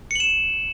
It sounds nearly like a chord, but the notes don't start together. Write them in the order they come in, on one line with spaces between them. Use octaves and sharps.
C#7 F#7 E7